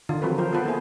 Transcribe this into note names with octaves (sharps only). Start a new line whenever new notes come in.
D3 D#3 F4
F3 F#3 C4 A#4 B4
F3 A#4 C5
B3 F4 A4 B4 C5
A#3 E4 G#4 C5